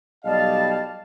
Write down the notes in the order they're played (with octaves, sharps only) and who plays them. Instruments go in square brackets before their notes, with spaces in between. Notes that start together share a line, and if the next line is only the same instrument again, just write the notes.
[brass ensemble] B1 G3 F5 [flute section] D5 D#5 A5